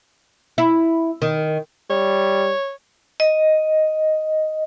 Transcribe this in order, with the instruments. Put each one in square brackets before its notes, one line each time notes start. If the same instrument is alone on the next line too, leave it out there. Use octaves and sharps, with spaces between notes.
[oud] E4
D#3
[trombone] G3 [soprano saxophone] C#5
[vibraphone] D#5